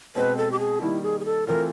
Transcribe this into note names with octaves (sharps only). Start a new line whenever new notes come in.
B2 G#3 C4 B4
A4
G4
G#4
D#3 G3 A#3 E4
G#4
G#4
A4
E3 A3 C4 F4 A#4